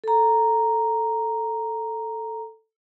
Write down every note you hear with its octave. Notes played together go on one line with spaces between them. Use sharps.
A4 A#5